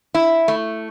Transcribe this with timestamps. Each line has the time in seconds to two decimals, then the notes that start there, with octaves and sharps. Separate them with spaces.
0.15 E4
0.48 A3